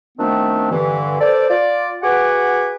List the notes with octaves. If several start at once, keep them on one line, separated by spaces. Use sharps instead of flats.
D#3 F3 A3 B3 C4 D4
G2 D3 E3
A4 B4 C5 D5
F4 D5
F#4 G#4 B4 F#5 G#5 D6